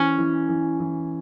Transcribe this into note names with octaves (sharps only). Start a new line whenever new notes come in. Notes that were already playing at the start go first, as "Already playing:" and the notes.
Already playing: E3 C#4
E3
E3
E3